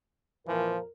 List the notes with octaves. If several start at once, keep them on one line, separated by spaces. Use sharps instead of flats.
F2 A#2 E3 F3 A#4